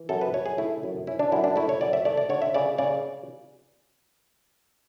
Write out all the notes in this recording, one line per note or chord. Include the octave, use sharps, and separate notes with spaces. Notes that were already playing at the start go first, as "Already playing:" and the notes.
Already playing: E3
F#2 A4
B4
F#2 C#5
G#4
A3 E4
F#2
C#4 E4
D4
F#2 E4
D4
A3 E4
C#5
F#2 D5
E5
A3 D5
D5
D3 C#5
E5
C#3 D5
C#3 D5